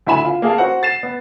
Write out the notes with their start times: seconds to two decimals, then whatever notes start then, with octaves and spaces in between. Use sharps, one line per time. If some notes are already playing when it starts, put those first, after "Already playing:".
0.06 D2 E4 E5 G#5 B5 E7
0.24 F4
0.42 A#3 G#4 F5 A5
0.58 F#4 C5 F#5
0.83 A6 C7 E7
1.03 B3